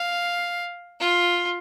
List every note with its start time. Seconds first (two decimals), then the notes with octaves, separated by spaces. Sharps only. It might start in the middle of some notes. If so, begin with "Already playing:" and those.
Already playing: F5
1.00 F4